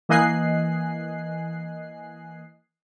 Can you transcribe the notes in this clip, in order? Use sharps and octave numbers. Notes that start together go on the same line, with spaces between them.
E3 A#3 D#5 G#5 F#6 C7